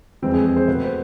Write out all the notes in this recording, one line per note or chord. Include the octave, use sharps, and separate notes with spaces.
F2 E3 G#3 C4
G#4
G#4
C5
B2 A3 B4
C5